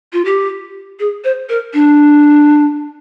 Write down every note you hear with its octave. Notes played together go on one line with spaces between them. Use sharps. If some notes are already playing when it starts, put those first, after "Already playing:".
F4
G4
G#4
C5
A#4
D4